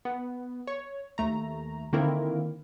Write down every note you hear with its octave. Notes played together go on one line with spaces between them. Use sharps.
B3
C#5
D#2 A3 A#5
D3 D#3 A#3 C4 E4 A#4